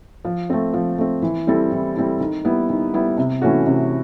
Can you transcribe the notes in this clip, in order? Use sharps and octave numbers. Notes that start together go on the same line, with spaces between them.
F3
A3 C4
F3
A3 C4
E3
G3 C4 E4 A4
E3
G3 C4 E4 A4
D#3
G3 B3 E4
D#3
G3 B3 E4
C3
E3 A3 C#4 F#4
C3